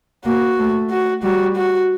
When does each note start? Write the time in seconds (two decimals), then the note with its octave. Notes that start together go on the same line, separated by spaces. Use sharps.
0.25 A#3 F#4
0.59 A3
0.91 F#4
1.23 G3 F#4
1.56 F#4